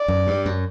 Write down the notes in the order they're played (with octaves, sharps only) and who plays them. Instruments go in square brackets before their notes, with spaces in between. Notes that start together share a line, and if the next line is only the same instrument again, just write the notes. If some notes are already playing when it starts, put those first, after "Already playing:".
Already playing: [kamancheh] D5
[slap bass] F#2
G2
F#2